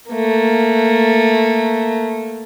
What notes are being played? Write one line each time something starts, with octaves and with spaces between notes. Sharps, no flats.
A3 A#3